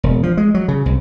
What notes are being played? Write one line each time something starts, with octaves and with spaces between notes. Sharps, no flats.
E1
F3
G#3
F#3
C#3
C2